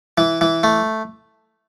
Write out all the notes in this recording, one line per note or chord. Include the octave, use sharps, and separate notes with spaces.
E3
E3
A3